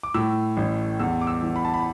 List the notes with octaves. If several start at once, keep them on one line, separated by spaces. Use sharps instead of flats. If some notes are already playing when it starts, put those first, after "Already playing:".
D6
A2 E6
A1
E2 E6
D6
E6
E3
B5
A5
B5